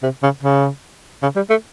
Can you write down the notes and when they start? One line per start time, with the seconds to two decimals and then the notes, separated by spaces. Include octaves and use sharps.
0.03 C3
0.23 C#3
0.43 C#3
1.23 C#3
1.36 G3
1.50 A3